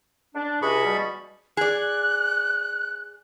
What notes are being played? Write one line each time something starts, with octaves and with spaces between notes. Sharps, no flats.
D4
C#2 C3 G#4 B5 C#6
B2 G3
G#4 D5 F#6